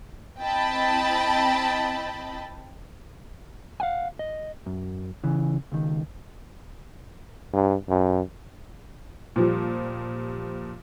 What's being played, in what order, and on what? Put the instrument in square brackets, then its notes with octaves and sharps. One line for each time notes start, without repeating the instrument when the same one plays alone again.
[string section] C4 E4 D#5 G5 A5 B5
[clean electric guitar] F5 F#5 G#5
D#5
F#2
C#3 E3
C#2 D#3
[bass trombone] G2
F#2
[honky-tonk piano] A#2 F3 G3